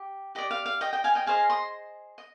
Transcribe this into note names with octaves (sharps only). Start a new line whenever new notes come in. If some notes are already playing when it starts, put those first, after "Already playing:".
Already playing: G4
G4 D5 D#5
F5
F5
D#5 G5
D#5 G5
F5 G#5
D#5 G5
G#4 C5 D#5 F5 G#5
C6 D#6
D#5